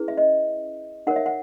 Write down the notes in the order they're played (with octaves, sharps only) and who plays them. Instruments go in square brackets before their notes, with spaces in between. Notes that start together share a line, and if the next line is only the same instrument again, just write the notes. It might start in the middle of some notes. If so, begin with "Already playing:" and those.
Already playing: [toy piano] C#4 E4 G#4 B4
E5
D#5
D#4 A#4 C#5 F#5
E5
F#5